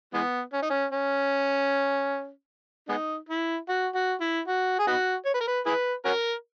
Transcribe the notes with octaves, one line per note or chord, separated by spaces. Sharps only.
E3 G#3 B3
C#4
D#4
C#4
C#4
G#3 B3 D#4
E4
F#4
F#4
E4
F#4
G#4
B3 D#4 F#4
C#5
B4
A#4
B4
E4 G#4 B4
C#4 F#4 A#4